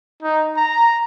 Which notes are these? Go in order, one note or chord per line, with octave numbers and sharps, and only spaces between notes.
D#4
A#5